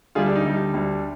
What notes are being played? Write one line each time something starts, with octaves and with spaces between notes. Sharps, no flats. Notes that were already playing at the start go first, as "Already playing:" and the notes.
D2 D3 G3 F4 G#4
D4
D#4
D2 D3 G3
D2 D3 G3